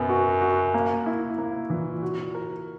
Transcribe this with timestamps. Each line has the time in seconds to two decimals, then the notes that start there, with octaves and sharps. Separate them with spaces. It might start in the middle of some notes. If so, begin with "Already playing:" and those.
Already playing: F#2 B2 B3
0.09 F#4
0.41 F#4
0.74 A#3
1.06 E4
1.38 A#3
1.70 A#2 E3
2.03 F#4
2.35 A#4